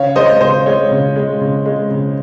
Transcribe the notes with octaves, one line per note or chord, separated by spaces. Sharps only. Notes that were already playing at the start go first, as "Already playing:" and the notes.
Already playing: C#3 C#5 F5
G#3 C5 D#5
C#3 C5
G#3 C#5
C#3
G#3
C#3
G#3
C#3